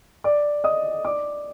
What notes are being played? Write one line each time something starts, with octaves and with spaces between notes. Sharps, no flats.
D5 D6
D#5 D#6
D5 D6